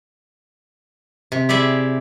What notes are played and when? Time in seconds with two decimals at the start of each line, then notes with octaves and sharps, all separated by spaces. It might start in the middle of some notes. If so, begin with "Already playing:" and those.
1.32 C3
1.49 E4 G4 G#4 D5 E5